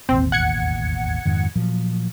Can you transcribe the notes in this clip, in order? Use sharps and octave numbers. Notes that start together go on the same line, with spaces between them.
E1 A1 D#2 C4
F#5 G#6 C#7
F2 G#2 D#3
A#2 F3 F#3